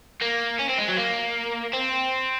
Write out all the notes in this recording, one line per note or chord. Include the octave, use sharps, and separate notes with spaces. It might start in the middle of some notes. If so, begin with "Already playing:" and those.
A#3
C#4
C4
G#3
F#3
A#3
C4